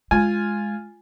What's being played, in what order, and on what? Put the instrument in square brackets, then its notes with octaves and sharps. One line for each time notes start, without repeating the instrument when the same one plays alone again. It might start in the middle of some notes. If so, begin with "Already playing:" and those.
[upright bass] G#3 [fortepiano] F4 G#5